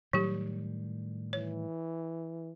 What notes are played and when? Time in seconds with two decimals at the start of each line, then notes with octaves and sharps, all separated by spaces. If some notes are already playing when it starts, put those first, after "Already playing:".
0.13 A2 D#3 F#3 G3 G4
1.33 E3 C#5